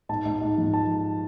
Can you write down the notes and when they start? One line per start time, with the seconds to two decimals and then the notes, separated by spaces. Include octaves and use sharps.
0.09 G#2 A5
0.25 G#2
0.41 G#2
0.58 F3
0.73 A5